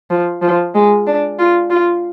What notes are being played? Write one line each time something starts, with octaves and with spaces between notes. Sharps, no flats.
F3
F3
G#3
D4
F4
F4